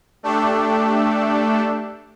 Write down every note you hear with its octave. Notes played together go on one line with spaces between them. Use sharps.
A3 D4 G4 A4